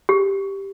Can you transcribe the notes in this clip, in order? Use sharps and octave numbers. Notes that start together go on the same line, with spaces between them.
G4